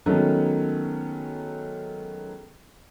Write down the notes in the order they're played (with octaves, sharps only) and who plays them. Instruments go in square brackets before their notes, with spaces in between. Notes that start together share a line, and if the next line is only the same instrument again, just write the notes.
[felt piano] D#3 F#3 G#3 A3 B3 C#4